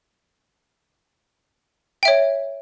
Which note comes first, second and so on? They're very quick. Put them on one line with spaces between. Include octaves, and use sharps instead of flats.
G5 E5 C#5